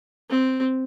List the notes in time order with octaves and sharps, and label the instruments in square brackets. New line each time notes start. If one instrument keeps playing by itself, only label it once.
[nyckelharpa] C4